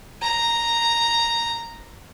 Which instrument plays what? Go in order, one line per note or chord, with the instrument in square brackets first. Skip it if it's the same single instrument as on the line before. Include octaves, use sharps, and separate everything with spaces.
[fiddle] A#5